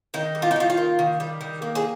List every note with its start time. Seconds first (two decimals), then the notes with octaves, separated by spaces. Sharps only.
0.14 D#3 D#4
0.35 G3
0.42 F4
0.51 D#4
0.56 D#3 F4
0.70 F4
0.77 A#3
0.99 D#3
1.20 G3
1.41 D#3
1.62 A#3
1.75 G#4